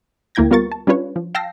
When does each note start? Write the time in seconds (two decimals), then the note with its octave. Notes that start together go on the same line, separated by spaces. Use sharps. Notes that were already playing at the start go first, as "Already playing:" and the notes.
0.35 D2 A#3 E4 G5 G#6 A#6
0.51 G3 B3 F4 A#4 C#6 A6
0.72 A5
0.87 G3 C#4 D4 F4 B4 C#5
1.16 F3
1.35 F5 G5 A5 E6 A#6 C7